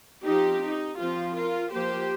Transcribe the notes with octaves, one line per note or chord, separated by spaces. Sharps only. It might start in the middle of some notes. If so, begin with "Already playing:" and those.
F3 C4 D#4 G4
D#4
F3 C4 F4
F4 A#4
F3 A#3 G4 C5